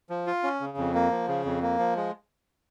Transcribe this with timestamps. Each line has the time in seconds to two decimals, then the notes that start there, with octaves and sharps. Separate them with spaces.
0.10 F3
0.27 F4
0.43 C#4
0.60 C#3
0.77 F2
0.95 A#3
1.11 F3
1.28 C#3
1.45 F2
1.62 A#3
1.79 F3
1.96 G#3